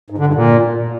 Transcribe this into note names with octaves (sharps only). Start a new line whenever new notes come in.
G#2
D3
G2
A#2